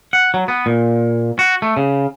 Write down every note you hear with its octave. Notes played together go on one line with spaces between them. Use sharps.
F#5
F#3
B3
A#2
F#4
A3
C#3